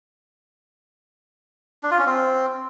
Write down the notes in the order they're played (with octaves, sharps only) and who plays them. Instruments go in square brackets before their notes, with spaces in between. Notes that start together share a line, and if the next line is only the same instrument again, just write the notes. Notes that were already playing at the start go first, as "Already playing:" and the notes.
[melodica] D4
F4
C#4
C4